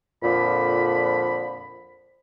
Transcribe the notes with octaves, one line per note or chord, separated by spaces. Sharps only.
F2 A#2 D3 F3 B5